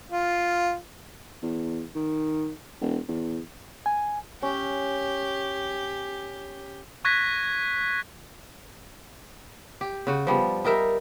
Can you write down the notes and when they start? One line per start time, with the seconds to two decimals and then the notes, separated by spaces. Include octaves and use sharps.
0.10 F4
1.43 E2
1.95 D#3
2.81 E1
3.08 E2
3.86 G#5
4.42 C#4 G4
7.05 C#6 F#6 G#6 A#6 B6
9.81 G4
10.07 C#3 F#4
10.27 F3 G3 B3
10.65 G3 D#4 A#4 E5